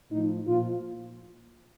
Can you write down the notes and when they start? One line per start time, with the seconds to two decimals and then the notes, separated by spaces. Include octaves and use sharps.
0.11 A2 F3 D#4
0.47 A#2 F3 F4